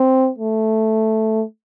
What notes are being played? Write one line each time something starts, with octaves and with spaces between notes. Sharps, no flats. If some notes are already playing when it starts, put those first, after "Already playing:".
Already playing: C4
A3